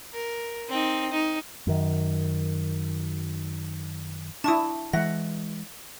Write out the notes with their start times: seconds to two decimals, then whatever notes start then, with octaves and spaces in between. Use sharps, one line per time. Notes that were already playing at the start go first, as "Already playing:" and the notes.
0.13 A#4
0.69 C4 D#4
1.12 D#4
1.67 F#2 D#3
4.44 D4 E4 A5 C#6 D#6
4.93 E3 G#3 E5 F#5 A#6